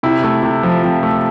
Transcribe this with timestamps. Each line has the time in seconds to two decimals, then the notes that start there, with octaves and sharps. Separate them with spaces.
0.03 C3 E4
0.24 A3
0.43 C3
0.63 F3
0.84 C3
1.03 A3